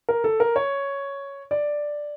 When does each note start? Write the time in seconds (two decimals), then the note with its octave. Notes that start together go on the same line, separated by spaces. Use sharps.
0.09 A#4
0.24 A4
0.40 A#4
0.56 C#5
1.51 D5